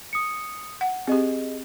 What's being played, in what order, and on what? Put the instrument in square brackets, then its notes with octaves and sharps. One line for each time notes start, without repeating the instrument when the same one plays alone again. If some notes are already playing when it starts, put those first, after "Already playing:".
[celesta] D#6 C#7
[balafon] F#5
[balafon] C4 G4 [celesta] G#4 D#5